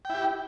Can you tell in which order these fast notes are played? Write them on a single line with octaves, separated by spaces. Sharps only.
G5 E4 G4